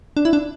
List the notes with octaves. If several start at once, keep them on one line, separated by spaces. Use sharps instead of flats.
D4
E4
D4